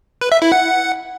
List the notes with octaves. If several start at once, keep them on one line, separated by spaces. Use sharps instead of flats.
B4
E5
E4
F#5